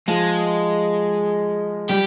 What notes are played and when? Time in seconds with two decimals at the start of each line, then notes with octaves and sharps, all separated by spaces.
0.08 F3 G#3
1.89 G3 G4